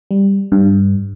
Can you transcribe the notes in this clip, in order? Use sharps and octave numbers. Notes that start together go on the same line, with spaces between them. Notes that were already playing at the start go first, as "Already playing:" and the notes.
G3
G2